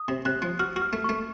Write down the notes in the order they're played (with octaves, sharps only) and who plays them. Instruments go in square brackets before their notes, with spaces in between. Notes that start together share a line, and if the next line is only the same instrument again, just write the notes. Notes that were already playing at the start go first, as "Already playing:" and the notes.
Already playing: [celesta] D#6
[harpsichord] C3
[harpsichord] C3 [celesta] F#6
[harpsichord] F3
[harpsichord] F#4 [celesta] F6
[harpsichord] F#4
[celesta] F6
[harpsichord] A3
[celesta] C#6
[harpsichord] A3